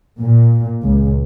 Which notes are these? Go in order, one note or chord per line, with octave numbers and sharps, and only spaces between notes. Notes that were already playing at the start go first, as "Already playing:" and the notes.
A#2
C#2